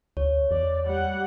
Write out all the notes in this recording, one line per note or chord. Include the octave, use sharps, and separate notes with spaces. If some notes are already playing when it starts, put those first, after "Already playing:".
D2 C#5
E2 D5
G3 F#5